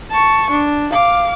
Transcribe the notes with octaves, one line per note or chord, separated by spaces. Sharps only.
A5 C#6
D4
F5 D6